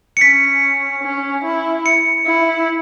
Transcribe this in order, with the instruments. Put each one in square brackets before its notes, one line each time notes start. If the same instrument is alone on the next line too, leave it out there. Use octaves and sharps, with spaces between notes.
[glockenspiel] C#7
[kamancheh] C#4 [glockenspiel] B6
[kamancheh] C#4
E4
[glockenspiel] C#7
[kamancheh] E4